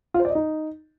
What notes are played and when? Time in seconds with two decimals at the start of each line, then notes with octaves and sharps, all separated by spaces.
0.14 F4
0.20 C5
0.25 D5
0.30 D#5
0.35 D#4